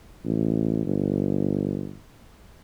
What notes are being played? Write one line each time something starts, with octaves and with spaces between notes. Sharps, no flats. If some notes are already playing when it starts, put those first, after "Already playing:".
A1
G1